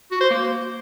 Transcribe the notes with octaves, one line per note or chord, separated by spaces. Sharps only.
F#4
C5
A#3